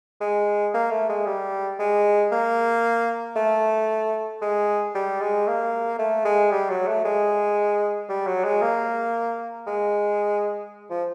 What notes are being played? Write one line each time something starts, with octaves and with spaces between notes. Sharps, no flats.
G#3
A#3
A3
G#3
G3
G#3
A#3
A3
G#3
G3
G#3
A#3
A3
G#3
G3
F#3
A3
G#3
G3
F#3
G#3
A#3
G#3
F3